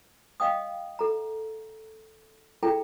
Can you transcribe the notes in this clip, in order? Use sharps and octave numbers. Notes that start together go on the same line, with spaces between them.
D#5 F5 G5 D#6
A4 A#5
E4 G#4 A4 G5 A#5